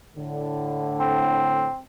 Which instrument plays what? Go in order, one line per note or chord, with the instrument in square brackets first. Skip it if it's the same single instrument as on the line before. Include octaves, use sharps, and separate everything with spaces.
[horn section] A2 D3
[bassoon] C4